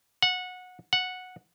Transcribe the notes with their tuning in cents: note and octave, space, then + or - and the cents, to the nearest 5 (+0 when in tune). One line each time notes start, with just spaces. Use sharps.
F#5 -20
F#5 -10